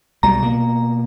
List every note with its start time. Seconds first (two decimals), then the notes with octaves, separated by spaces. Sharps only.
0.23 B1 B2 G3 A#5
0.42 B2 A#3